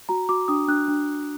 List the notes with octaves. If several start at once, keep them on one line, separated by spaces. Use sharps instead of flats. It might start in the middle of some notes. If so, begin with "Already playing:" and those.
F#4 A#5
F#4 D6
D4 D#6
D4 F#6
D4